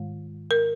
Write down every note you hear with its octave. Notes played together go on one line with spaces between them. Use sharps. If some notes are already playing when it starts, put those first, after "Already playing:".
Already playing: G#2 D#3 G#3
A#4